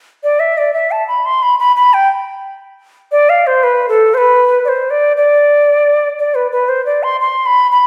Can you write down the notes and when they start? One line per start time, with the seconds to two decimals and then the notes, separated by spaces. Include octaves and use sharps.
0.23 D5
0.40 E5
0.58 D5
0.74 E5
0.91 A5
1.08 B5
1.26 C6
1.42 B5
1.59 B5
1.76 B5
1.94 G5
3.12 D5
3.29 F5
3.47 C5
3.64 B4
3.89 A4
4.14 C5
4.18 B4
4.65 D5
4.68 C5
4.90 D5
5.17 D5
6.19 D5
6.35 B4
6.52 B4
6.69 C5
6.86 D5
7.03 C6
7.21 C6
7.46 B5
7.72 B5